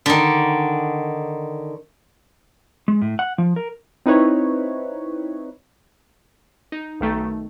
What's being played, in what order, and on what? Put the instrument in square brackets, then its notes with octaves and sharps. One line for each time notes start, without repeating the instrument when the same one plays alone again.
[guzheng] D3 D#3
[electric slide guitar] G#3
A2
F#5
F3
A#4
[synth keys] C4 D#4 E4 B4 C#5
D#4
B1 D#3 A3